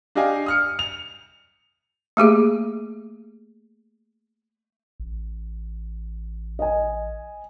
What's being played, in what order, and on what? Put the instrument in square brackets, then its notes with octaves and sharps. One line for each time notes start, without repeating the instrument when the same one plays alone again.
[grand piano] D4 G4 D#5 F5 G#5
D#6 F6 C#7
F7
[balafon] A3 A#3 G4 G#4
[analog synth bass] A1
[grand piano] D#5 G#5